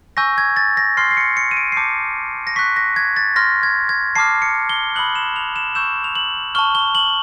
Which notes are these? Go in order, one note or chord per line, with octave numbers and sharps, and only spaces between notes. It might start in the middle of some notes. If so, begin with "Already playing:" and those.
G#5 C#6 E6 G6 A#6
G#6
A6
A#6
C6 F6 C7
C7
C#7
C#7
D#7
D7
C7
A5 D6 G6 C#7
A#6
C#6 F#6 B6
A#6
G#6
A6
C6 F6 A#6
G#6
G#6
A5 D6 F6 C7
C#7
G7
B5 D#6 F#6 F#7
E7
F7
E7
C#6 E6 G6 E7
F7
F#7
A5 C#6 F6 G7
G7
F#7